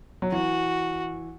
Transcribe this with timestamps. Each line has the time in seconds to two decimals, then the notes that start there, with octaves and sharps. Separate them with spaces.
0.22 F#3
0.32 E3 F#4